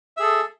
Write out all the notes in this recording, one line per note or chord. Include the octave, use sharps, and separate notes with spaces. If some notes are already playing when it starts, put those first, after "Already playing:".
G#4 A4 E5